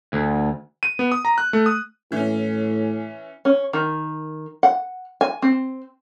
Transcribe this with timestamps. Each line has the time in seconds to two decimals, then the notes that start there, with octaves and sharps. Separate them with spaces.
0.13 D2
0.83 D#7
0.99 B3
1.12 D#6
1.25 A#5
1.38 F#6
1.53 A3
1.66 D#6
2.12 A2 E3 C#4
3.45 C#4
3.73 D#3
4.63 F#5
5.21 G#5
5.42 C4